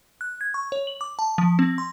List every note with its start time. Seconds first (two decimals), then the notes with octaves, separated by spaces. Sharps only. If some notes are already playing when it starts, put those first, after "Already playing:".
0.21 F#6
0.41 G#6
0.54 C#6
0.72 C#5
0.87 F#7
1.01 D6
1.19 A5
1.38 F3
1.59 C4
1.78 C6